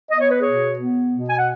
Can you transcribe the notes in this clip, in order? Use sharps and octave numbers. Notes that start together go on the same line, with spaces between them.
B3 D#5
C#5
B4
B2 G#4 C#5
B3
B2
G#5
F#5